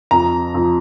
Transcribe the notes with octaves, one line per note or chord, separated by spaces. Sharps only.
F2 A#5
F2